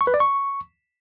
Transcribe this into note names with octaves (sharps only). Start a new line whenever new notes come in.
C#6
B4
D5
C#6